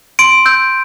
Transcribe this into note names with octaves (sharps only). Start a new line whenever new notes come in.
C6 D7
E6 G6